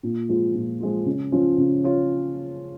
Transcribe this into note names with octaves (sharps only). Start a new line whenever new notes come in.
A#2
F3 G#3 F4
A#2
F3 G#3 F4
C#3
F3 C#4 F4 C#5
C#3
F4 C#5